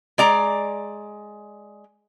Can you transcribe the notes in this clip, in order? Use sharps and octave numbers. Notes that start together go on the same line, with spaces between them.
G#3 D5 A#5